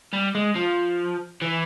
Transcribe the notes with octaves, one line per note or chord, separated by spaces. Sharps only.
G3
G#3
F3
E3